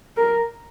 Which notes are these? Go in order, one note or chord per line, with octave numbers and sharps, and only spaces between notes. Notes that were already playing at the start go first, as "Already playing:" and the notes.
A#4